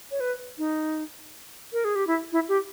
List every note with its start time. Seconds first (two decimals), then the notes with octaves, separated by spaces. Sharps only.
0.11 C#5
0.20 B4
0.58 D#4
1.73 A#4
1.85 G#4
1.95 G4
2.07 E4
2.32 E4
2.49 G4